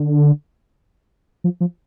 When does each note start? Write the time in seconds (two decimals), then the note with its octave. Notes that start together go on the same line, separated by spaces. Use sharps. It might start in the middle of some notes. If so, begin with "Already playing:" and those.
Already playing: D3
1.44 F3
1.61 F3